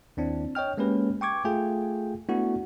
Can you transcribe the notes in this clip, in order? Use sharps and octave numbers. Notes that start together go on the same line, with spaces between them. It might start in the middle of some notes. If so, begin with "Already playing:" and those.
D#2 C4 D4 E4
C#5 D#5 G5 F6
G#3 A#3 C#4 G4 B4
G5 C#6 D6 G#6
A3 F4 G#4 G5
A3 B3 D4 E4 F#4